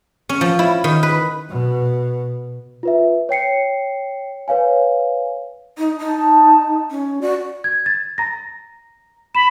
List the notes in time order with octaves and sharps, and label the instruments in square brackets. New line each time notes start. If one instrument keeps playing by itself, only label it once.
[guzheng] C#4
F3
E4
D#3
B4
[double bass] B2
[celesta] F4 B4 E5
C#5 G5 C7 C#7
B4 C#5 F5 G#5
[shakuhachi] D#4
[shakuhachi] D#4 [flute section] A5
[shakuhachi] C#4
[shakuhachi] F#4 [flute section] D5
[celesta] G#6
A6
A#5 A#6
[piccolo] B5 [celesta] E7